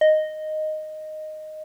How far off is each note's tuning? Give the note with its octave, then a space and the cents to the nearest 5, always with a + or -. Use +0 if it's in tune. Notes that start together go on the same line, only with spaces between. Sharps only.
D#5 -5